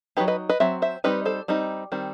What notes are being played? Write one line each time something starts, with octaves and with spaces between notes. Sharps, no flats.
F#3 C4 D#4 G4 B4
B4 D#5
B4 D#5
F#3 C4 E5
C5 E5
G3 C4 D#4 B4 D#5
A4 C5
G3 C4 D#4
D#3 G3 C4